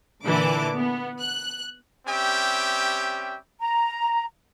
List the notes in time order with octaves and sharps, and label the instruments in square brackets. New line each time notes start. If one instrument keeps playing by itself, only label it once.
[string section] A#2 D3 E3 A5 D6
B3
F#6
[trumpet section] G3 C4 C#4 G4 E5 G5
[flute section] A#5